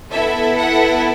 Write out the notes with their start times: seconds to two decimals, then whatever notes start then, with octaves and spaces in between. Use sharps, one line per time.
0.12 B3 E4 A4 E5
0.57 F#5